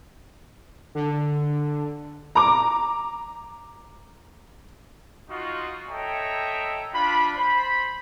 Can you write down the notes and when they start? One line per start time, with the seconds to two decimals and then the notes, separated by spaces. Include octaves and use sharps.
0.95 D3
2.35 A#5 D6
5.29 D#4 F4 F#4
5.88 A4 C#5 D#5 E5 G5 A#5
6.93 D4 F4 B5
7.36 C5 B5